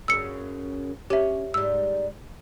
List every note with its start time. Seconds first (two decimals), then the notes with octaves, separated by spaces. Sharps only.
0.08 F#2 C#3 E6 C#7
1.10 C#4 G4 E5
1.54 G#2 G3 E6